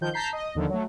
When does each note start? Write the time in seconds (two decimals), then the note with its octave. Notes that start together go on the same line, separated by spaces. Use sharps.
0.01 D#3 F3 G6
0.14 A5 A#5 G6 B6 C7
0.33 D#5
0.55 D#2 D3 D#3 F3
0.69 F#3 A3